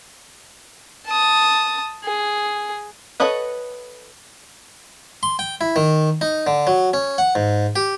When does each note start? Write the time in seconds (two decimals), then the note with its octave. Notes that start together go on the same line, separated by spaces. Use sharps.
1.06 A5 D#6
2.04 G#4
3.20 A4 B4 C#5 D#5 F#5
5.23 C6
5.39 G5
5.61 E4
5.76 D#3
6.21 D#4
6.47 D3
6.67 F#3
6.93 C#4
7.18 F#5
7.35 G#2
7.76 G4